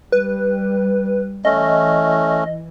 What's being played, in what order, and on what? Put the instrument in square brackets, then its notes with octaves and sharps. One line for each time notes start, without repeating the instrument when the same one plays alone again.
[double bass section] G3 [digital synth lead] B4
[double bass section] E3 [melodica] A3 C#4 [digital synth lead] D#5